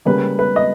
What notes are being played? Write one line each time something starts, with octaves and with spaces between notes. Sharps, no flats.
C#3 G3 A#3 B4
B4
D#5